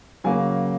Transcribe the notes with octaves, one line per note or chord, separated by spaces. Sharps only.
C#3 F#3 A#3 G#5